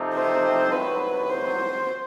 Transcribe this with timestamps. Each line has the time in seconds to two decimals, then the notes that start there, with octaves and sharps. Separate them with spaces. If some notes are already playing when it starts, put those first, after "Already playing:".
Already playing: C3 F3 A3 C4 D#4
0.15 C5
0.72 C2 C3 D#3 F#3 B4
1.29 C5